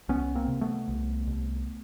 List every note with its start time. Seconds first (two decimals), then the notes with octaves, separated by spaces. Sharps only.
0.09 C2 B3 C#4
0.35 A#3 C4
0.48 C3
0.61 A3 B3
0.88 C2
1.27 C2